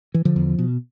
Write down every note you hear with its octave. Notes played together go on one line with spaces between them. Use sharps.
E3
D3 F3
E2
B2